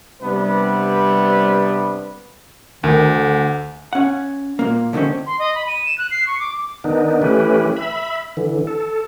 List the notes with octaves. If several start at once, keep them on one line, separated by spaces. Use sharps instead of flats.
C3 G3 B3 D4 B4
D2 D#3
D3
C#4 F#5
A#2 A#3
D3 D#3 A3 C4 C#4
C6
D#5
B5
D#7
E7
F#6
C7
C#6
D6
D#3 B3 D4 D#4
E3 A3 C#4 G4 B4
E5 B5
D3 E3
A4